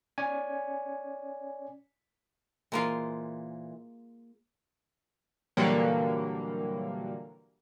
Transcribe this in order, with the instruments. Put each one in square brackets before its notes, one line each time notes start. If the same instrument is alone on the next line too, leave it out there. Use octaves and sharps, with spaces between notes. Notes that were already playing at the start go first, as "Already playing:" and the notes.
[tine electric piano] C#4 C#5 D5 G#5
[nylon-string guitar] A#2 E3 C5 [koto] G#3 A#3 F4
[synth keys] A#2 D3 E3 F#3 G3 A#3